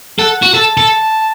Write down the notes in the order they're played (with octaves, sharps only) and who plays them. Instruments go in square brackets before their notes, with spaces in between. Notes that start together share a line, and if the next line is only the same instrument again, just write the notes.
[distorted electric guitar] A4 [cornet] F#5
[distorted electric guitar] F#4
[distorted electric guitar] A4 [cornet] A5
[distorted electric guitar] A4